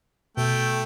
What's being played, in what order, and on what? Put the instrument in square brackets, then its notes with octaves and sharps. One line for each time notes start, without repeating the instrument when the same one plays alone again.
[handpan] B2 [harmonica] A3 G5